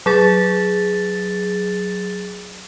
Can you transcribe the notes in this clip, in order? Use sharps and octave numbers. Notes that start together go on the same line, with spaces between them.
F#3 G#4 A6